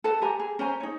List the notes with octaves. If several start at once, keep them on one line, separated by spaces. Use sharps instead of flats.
A4 B4 F#5 A5
G4 G#5 A#5
G#4
C#4 C5 G#5 A#5
D#4 C#5